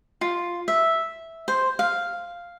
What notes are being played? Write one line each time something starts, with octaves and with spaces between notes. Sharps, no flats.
F4
E5
C5
F5